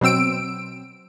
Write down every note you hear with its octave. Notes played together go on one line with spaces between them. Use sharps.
B2 F#3 C4 E6 D7